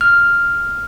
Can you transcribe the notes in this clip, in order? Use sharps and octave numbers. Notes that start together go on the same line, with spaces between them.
F6